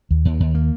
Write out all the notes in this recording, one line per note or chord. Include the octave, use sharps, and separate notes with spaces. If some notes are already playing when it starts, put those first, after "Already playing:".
D#2
D#2
D#2
A#3